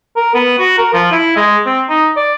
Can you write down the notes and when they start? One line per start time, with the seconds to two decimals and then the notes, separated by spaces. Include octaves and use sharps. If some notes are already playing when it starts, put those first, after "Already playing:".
0.17 A#4
0.34 B3
0.59 F#4
0.78 A#4
0.94 F3
1.12 E4
1.36 G#3
1.66 C4
1.89 D#4
2.17 D5